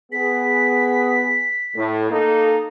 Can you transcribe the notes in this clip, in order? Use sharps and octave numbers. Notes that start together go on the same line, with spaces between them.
B3 G#4 B6
A2
A#3 D#4 A4